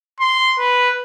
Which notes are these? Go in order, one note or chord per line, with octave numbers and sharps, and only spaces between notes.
C6
B4